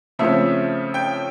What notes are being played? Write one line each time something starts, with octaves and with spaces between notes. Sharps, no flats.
C#3 F3 A3 C4 E5
G5